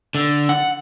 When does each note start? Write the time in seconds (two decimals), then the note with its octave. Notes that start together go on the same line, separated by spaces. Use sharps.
0.15 D3
0.49 F#5